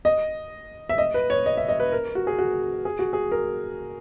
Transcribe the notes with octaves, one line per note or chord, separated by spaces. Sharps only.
D#5
E5
D#5
B4
C#5
D#5
E5
D#5
B4
A#4
F#4
G#4
F#4
G#4
F#4
G#4
A#4